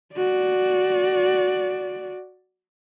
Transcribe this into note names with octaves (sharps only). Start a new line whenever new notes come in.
F#4 D5